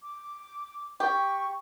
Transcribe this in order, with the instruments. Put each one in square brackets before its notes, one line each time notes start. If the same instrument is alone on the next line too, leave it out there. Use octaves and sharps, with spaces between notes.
[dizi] D6
[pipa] G4 [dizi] C#6